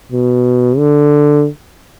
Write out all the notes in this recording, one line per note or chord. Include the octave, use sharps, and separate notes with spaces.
B2
D3